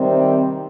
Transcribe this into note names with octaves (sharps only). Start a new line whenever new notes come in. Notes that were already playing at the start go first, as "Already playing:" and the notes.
Already playing: C3 D#3 G3 C4